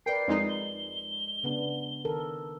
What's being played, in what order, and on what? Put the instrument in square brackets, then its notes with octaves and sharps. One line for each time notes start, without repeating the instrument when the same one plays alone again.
[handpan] A#4 B4 D5 [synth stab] G5 [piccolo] C7
[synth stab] F2 G#3 D#4
[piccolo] G7
[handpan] C#3 B3 D4
D#3 A4 A#4